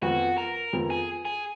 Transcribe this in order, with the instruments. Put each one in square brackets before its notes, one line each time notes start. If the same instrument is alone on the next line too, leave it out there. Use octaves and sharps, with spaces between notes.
[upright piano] F2 F3 B3 [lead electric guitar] F#4
[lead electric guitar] A#4
[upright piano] F2 F3 B3
[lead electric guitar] G#4
G#4